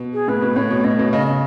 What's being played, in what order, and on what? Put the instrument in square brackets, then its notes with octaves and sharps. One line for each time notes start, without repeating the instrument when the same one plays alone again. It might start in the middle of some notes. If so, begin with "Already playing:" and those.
Already playing: [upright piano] B2
[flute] G#4
[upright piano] A2 [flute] B4
[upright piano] B2
[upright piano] A2 [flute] C#5
[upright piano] B2
[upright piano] A2 [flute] D#5
[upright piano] B2
[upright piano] C#3 [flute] D#5
[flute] D#5